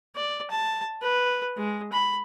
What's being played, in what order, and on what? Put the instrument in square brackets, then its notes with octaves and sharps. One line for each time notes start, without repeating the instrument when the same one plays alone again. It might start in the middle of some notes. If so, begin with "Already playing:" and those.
[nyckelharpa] D5
A5
B4
G#3
B5